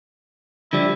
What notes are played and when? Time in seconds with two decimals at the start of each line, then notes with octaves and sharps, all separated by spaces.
0.73 D3 F3 G3 E4